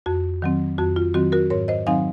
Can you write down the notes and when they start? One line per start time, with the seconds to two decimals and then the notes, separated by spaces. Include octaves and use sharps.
0.06 F2 F#4
0.42 D#3 F#3 C4
0.78 F2 F#4
0.96 F4
1.14 D#3 F#3 C4 F#4
1.32 F#4 A#4
1.50 G#2 A#4 C#5
1.68 C5 D#5
1.87 D#3 F#3 C4 D#4 F5 G#5